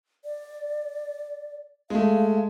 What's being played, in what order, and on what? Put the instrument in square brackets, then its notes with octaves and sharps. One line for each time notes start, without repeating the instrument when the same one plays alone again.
[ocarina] D5
[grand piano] G#3 A3 [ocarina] F5